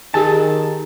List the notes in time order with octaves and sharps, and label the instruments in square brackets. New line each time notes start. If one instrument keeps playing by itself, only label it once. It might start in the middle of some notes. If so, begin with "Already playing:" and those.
[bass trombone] D#3 [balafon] G4 G#4 G#5 [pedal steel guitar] A5